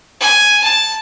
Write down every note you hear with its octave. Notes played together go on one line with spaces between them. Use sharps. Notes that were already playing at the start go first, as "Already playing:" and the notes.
G#5
A5